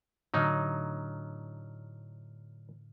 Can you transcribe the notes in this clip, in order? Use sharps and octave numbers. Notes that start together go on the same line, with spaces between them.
A2 D3 F#3 D#4 F6